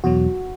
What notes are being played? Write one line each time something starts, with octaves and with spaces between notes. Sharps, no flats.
E2 B2 F#3 F#4